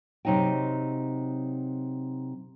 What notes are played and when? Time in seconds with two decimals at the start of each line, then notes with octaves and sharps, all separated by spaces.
0.25 C3 F#3 D#4 D#5 G5